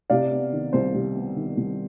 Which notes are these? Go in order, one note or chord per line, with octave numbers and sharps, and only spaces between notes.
C3 D5 F5
B3
D#3
C2 C5
C3
B3
D#3
C2